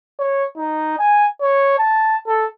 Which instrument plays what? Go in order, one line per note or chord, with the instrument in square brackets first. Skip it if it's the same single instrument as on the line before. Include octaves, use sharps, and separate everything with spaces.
[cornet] C#5
D#4
G#5
C#5
A5
A4